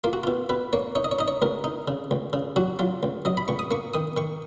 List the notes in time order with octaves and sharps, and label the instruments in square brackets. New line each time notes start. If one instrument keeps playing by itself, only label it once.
[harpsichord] A#3 F4
F#4
B2 F4
B2 B4
A#3 C#5
D#4 C#5
D#5
C#5
D#4 D#5
C#5
C#2 A#4
D#4
C#3
C#2
C#3
F#3 F#4
F#3 F4
C#2
F#3 D#5
B5
C#2 C#6
D#6
A#3 C#6
D#3 D#6
D#3 C#6